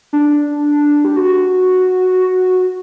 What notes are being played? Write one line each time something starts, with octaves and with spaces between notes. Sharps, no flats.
D4
G4
F#4